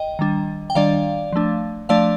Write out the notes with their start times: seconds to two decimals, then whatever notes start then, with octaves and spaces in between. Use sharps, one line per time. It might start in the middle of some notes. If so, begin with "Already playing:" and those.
Already playing: D#5 G5
0.19 D#3 G3 D4
0.70 G5
0.75 D#3 G3 D4 D5 F5
1.33 F3 A3 D4
1.89 F3 A3 D4 D5 F5